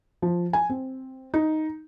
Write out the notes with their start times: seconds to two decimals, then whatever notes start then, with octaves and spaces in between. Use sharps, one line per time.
0.22 F3
0.53 G#5
0.70 C4
1.34 D#4